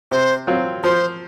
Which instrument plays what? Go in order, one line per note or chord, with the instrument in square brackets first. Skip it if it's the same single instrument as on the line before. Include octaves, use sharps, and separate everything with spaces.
[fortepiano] C3 [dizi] C5
[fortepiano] F#3 C4 F4
[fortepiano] F3 [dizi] C5